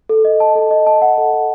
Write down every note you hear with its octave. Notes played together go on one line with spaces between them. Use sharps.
A4
D#5
A5
A4
D#5
A5
F#5
A4
A4